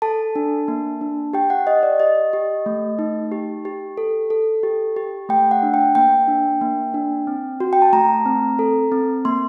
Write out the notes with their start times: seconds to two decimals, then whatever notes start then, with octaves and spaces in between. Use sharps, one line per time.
0.02 A4 A5
0.36 D4
0.68 A#3
1.01 D4
1.33 G4 G5
1.50 F#5
1.67 G4 D#5
1.83 D5
2.00 G4 D#5
2.33 G4
2.66 A3
2.99 D#4
3.32 G4
3.65 G4
3.97 A4
4.30 A4
4.63 G4
4.96 G4
5.29 A3 G5
5.51 F#5
5.63 D4
5.74 G5
5.95 A#3 G5
6.28 D4
6.61 A#3
6.94 D4
7.27 C4
7.60 F#4
7.73 G5
7.82 A5
7.93 A3 A#5
8.26 C4
8.59 A4
8.92 C4
9.25 A#3 C6